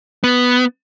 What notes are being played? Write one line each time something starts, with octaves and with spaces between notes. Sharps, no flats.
B3